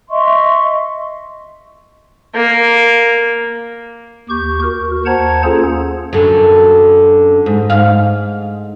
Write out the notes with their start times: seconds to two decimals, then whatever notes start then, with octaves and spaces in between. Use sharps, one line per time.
0.10 D#5 E5 C6 C#6
2.35 A#3
4.30 D#2 G4 C#6 G6
4.62 F#4 A#4
5.06 D#2 C5 F#5 A5 A#5 G#6
5.44 A#3 C#4 F4 G#4 A4 C5
6.13 F#2 D3
7.46 G#2
7.70 G#2 F5